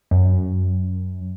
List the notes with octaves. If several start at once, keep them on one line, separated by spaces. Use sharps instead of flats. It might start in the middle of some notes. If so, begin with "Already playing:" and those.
F#2